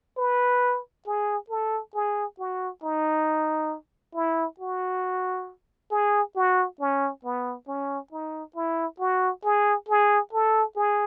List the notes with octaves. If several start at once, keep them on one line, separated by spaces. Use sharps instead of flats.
B4
G#4
A4
G#4
F#4
D#4
E4
F#4
G#4
F#4
C#4
B3
C#4
D#4
E4
F#4
G#4
G#4
A4
G#4